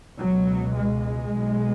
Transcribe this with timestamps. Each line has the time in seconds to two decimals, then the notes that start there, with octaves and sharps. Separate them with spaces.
0.18 C#2 B2 F#3
0.75 G#3
1.34 B1 B2